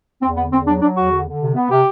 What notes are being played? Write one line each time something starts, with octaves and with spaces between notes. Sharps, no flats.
E2 C4
D3 B3
E2 C4
F#3 D4
F#3 D4
E2 F#4
D3
D3
C3
B3
C3 G4